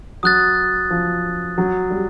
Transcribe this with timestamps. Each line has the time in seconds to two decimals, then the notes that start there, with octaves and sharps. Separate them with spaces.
0.23 F#3 D#6 F#6 A6
0.90 F3
1.58 F#3
1.90 G3